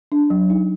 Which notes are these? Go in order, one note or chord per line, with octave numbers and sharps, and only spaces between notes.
D4
F#3
D#4